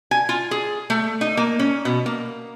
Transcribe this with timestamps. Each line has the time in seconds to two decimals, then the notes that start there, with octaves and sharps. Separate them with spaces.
0.11 G#5
0.29 F4
0.51 G#4
0.90 A3
1.21 D#4
1.37 A#3
1.59 C#4
1.85 B2
2.06 A#3